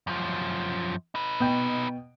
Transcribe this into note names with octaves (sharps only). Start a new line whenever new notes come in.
F#2 F3
D#4 B4
B2 G5